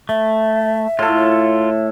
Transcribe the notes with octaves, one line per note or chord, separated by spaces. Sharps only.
A3 E5
A2 F4 A4